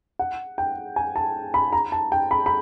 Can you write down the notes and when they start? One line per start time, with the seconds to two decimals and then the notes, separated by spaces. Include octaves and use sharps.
0.19 F#5
0.58 G5
0.96 G#5
1.16 A5
1.54 B5
1.73 A#5
1.92 A5
2.12 G5
2.31 B5
2.46 B5